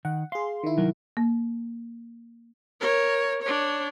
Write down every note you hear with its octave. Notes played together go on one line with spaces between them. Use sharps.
D#3 F#5
G#4 F5 C6
D#3 E4
C2 F#3 A#4
A#3
A#4 C#5
D4 C#5